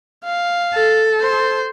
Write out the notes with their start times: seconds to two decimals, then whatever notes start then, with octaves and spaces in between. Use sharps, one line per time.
0.24 F5
0.74 A4
1.20 C5